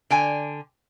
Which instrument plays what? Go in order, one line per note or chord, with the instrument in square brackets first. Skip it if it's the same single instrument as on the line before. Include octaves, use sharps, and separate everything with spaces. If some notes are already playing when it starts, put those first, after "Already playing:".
[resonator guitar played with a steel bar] D3 G5 G#5